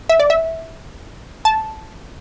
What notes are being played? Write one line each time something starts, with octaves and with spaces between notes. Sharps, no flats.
E5
D5
E5
A5